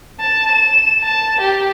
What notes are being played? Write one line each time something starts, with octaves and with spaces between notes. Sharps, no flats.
A5
E7
A5
G4